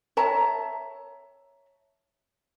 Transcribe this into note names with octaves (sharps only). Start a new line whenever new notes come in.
C#5 E5 A5 A#5